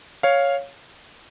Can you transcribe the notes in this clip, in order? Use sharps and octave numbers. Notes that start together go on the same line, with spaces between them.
C#5 F5